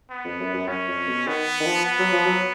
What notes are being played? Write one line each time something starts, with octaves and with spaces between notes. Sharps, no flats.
B3
F2
F#2
F#2
F#2 C#4
F2
B2
D#3 B3
D#3
F3
B3
F#3
F3
F#3